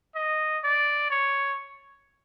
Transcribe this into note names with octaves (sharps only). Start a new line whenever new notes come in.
D#5
D5
C#5